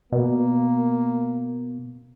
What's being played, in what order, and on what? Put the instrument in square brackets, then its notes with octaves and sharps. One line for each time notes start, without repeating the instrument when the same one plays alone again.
[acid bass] B2 [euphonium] A#3